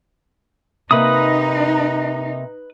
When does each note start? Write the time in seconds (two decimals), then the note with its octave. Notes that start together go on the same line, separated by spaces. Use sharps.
0.91 C3 A#3 D#4 B4 B5 D#6